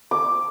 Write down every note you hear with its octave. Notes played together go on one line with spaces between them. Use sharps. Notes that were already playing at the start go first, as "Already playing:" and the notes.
D6